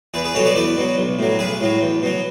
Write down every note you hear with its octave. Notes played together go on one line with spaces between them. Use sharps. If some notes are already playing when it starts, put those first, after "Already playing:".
E2 G#4 B4
G#4 B4
B2 F#3 A4 C#5
B4 D5
E2 B4 D5
B2 F#3
B1
A2 F#3
B1 G#4 B4
A2 F#3
E2
B2 F#3